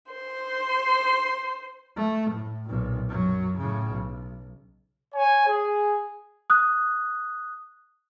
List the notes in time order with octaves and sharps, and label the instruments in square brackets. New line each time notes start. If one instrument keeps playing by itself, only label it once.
[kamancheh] C5 C6
[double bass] A3
A2
B1 A#2
F#2 F#3
A2 C#3
B1
[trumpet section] C#5 G#5
G#4
[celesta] D#6 F#6